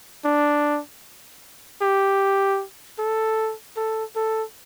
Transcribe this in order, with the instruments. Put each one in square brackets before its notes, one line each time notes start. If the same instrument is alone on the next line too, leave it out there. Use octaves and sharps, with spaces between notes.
[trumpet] D4
G4
A4
A4
A4